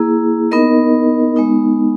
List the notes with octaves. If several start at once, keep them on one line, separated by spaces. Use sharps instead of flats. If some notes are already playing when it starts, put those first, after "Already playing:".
Already playing: A#3 E4 G#4
B3 D#4 A#4 D#5
G#3 B3 D#4